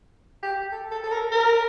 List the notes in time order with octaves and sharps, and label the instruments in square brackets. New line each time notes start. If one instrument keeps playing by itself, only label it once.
[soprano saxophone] G4
A4
A4
A4
A#4
A#4